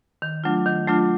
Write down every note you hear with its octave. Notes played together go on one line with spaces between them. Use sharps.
D#3
F#3 A3 D4 F4
D#3
F#3 A3 D4 F4